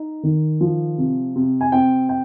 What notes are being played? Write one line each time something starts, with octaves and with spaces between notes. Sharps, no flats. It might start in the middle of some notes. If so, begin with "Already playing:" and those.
Already playing: D#4
D#3
F3
C3
C3
G#5
C4 G5
G5